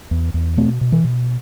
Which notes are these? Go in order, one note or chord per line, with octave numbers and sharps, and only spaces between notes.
E2
E2
B2 A3 C4
B2
E3
B2